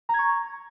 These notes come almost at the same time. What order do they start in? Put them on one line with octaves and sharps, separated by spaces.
A#5 G#6 C#6